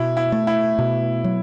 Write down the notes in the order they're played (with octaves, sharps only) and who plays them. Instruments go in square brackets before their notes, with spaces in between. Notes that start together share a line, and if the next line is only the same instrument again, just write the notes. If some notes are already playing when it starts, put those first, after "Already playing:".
Already playing: [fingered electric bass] B2 [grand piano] E4
[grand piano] E4
[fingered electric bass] A3
[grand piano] E4
[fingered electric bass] B2
F#3